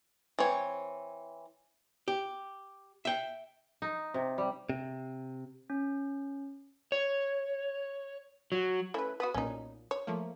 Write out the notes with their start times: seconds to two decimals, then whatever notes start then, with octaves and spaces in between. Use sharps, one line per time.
0.39 E3 C4 C#5
2.08 G4
3.05 E5 G5
3.82 D#4
4.14 C3
4.38 G3
4.70 C3
5.70 C#4
6.92 C#5
8.52 F#3
8.94 A3 C#4 E4 B4
9.20 B3 F#4 B4 D#6
9.34 B1 A#2 C#4 D#4
9.91 C#5
10.07 F3 A3 A#3